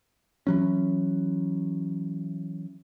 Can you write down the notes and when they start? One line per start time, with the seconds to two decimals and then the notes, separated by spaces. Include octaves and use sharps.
0.47 E3 F#3 C#4